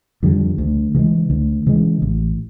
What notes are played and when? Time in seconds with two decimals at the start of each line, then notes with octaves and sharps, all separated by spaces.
0.23 F2 D3 G3
0.58 D2
0.95 C#3 E3 G#3
1.30 D2
1.67 C#3 E3 G#3
2.02 A1